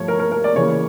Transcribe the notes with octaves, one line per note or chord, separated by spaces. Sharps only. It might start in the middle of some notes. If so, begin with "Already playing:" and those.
Already playing: G2 F3 A3 C#5
A#4
A#4
A#4
D5
C#3 E3 A#3 C#5